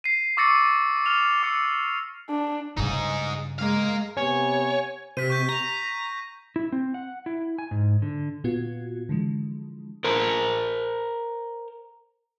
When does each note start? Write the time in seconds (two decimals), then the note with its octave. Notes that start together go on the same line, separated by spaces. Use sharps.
0.04 C7 D#7
0.37 C#6 D6 E6 A6 A#6 C#7
1.06 F6 F7
1.43 D6 E6 C#7
2.30 D4
2.77 G2 C#3 D#4 G#4
3.59 G#3 A#4 F5
4.17 C3 B3 G4 C#5 G#5
5.17 C3 B6 D#7
5.30 C#6 G6 B6
5.49 A#5
6.56 E4
6.72 C4
6.94 F#5
7.26 E4
7.59 G#5
7.71 G#2
8.02 D3
8.44 A#2 B3 F4 F#4 G#6
9.09 D3 E3 F3 G#3
10.04 A#4 C5